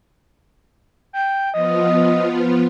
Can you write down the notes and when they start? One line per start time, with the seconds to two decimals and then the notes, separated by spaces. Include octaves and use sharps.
1.13 G5
1.54 F3 B3 F4 D#5